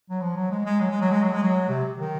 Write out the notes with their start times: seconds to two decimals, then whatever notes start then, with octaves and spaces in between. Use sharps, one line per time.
0.10 F#3
0.21 F3
0.36 F#3
0.51 G#3
0.66 G#3
0.80 F#3
0.91 G#3
1.01 F#3
1.12 G#3
1.22 F#3
1.33 G#3
1.43 F#3
1.69 C3
1.98 D#3